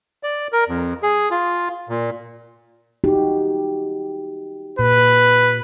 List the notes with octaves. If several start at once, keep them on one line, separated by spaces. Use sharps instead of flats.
D5
A#4
F2
G#4
F4
A#2
D#4 F#4 G4
A#2 B4